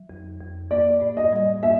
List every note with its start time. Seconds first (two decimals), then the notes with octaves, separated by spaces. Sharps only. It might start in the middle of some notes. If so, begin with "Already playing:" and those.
Already playing: F#3
0.10 F2
0.40 F2
0.71 A#3 D5
1.01 A2
1.17 D#5
1.33 G3
1.63 A#3 E5